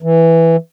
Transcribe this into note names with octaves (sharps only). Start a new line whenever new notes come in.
E3